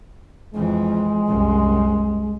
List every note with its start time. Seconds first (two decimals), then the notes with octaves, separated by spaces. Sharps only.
0.54 F2 E3 G#3
1.27 C2 F#2